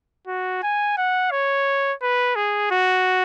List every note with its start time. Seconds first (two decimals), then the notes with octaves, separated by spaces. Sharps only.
0.27 F#4
0.63 G#5
0.97 F#5
1.31 C#5
2.02 B4
2.36 G#4
2.71 F#4